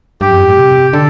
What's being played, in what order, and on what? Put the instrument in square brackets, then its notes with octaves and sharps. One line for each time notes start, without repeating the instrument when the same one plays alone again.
[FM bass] G2 [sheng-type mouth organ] G4
[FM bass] F2
G2
A2
C3
[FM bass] D3 [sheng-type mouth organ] A4